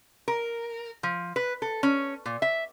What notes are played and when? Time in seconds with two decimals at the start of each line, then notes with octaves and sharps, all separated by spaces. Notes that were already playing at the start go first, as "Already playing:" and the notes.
0.28 A#4
1.03 F3
1.36 B4
1.62 A4
1.83 C#4
2.26 A#2
2.42 E5